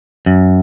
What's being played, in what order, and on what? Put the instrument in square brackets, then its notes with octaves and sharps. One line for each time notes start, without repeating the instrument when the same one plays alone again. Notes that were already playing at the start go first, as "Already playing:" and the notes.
[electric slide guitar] F#2